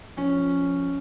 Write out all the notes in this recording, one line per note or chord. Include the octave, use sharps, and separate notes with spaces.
F3 C#4